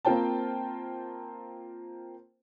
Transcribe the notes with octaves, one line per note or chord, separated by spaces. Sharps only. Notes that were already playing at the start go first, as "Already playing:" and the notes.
A#3 C4 F4 C5 G5 A5